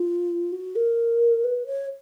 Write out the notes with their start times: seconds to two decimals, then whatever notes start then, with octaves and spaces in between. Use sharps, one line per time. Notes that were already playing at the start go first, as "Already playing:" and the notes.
Already playing: F4
0.52 F#4
0.75 A#4
1.44 B4
1.66 C#5